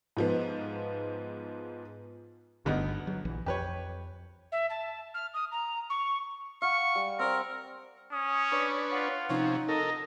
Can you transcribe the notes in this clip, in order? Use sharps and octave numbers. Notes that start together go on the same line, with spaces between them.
G#2 F3 B3
G1 D2 G2 D3 B3 D#4
F#3
A#1 E3
F2 G4 B4 C#5
E5
A5
F6
D#6
A#5
C#6
F5 F#5 C#6
G3
C4 A#4 D5
C#4 D#6
D4 B4 C#5
F4 F#5
C3 F3 C#4 D#4
A4 A#4 D#5